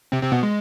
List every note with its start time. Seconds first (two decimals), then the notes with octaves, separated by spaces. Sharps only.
0.12 C3 C4
0.22 C3 C4
0.32 B2 B3
0.43 G#3